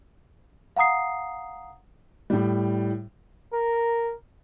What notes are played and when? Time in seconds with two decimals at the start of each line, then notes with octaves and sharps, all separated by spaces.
0.76 F5 F#5 A#5 D#6 C7
2.30 A2 G3
3.54 A#4